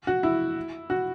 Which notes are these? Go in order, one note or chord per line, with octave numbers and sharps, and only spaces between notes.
F#4
E4
F#4